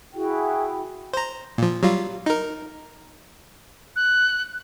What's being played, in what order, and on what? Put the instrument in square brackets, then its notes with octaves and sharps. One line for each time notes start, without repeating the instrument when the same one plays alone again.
[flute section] E4 F#4 G#4 G5
[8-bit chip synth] C5 A#5
A#2 F3
F#3 G3 F4
D#4 A#4
[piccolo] F#6